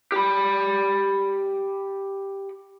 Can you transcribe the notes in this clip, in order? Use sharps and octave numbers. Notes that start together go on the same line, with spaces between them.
G4 B5